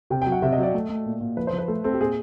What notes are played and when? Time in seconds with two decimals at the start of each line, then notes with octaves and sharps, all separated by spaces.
0.10 C3 G5
0.22 F#3 G5
0.32 F#5
0.42 C3 E5
0.53 F#3 D#5
0.63 D5
0.74 A3
0.89 A3
1.06 A#2
1.21 A#2
1.37 F3 B4
1.47 C5
1.53 F3
1.58 B4
1.68 A3 A4
1.84 C4 A4
1.94 G4
2.00 A#2 G#4